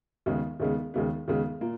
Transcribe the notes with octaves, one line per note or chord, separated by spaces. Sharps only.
D#2 C#3 G#3 B3
D#2 C#3 G#3 B3
D#2 C#3 G#3 B3
D#2 C#3 G#3 B3
A#2 A#3